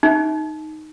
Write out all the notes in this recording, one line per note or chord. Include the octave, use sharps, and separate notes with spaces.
D#4